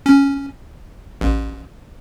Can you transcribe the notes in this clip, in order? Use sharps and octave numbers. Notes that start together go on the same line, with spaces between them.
C#4
A1